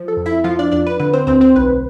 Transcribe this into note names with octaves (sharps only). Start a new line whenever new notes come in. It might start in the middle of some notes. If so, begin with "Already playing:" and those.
Already playing: F3
A4
F2
E4 E5
F3 F4 F5
D4 D5
F2 D4 D5
B4
D3 B4
C4 C5
D2 C4 C5
C4 C5
B1 B4